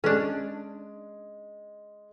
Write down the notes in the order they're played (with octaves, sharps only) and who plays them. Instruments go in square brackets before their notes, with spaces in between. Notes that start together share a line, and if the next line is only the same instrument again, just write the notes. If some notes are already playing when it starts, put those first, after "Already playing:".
[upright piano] G#3 [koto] C#4 D4